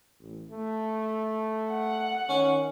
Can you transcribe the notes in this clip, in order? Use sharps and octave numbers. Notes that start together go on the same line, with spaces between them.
A1
A3
F#5
D#3 C#4